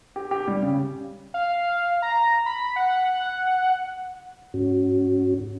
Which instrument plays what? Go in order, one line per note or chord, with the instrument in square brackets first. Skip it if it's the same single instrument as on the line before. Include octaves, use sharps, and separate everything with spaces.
[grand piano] G4
G4
G3
C#3
[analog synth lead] F5
A#5
B5
F#5
[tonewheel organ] G#2 C#4 F#4